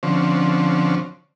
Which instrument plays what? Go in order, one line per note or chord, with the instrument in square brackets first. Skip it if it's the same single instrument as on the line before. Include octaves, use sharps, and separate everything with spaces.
[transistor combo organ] D3 F3 C4 C#4